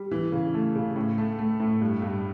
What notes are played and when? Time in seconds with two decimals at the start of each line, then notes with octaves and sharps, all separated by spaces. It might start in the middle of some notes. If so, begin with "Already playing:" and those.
Already playing: G3
0.11 E3
0.32 C#3
0.54 A3
0.75 C#3
0.96 A2
1.18 A3
1.39 A3
1.60 A2
1.82 G2
2.02 G2